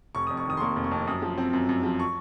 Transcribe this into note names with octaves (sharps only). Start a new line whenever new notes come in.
F1 C#6
D#6
F2
C#6
D#3 D#6
C6
A#3 C#6
F1
C#6
F2
F#2 D#6
F3
C4
F#2
F#2
F3
C#6